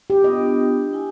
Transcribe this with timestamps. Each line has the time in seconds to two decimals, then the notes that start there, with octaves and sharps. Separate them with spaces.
0.10 G4
0.24 B3 D4 F4 D#5
0.93 E4 G#5